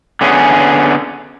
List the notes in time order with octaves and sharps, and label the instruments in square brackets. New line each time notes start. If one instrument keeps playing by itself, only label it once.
[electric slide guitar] D3 B3 C#4 G#4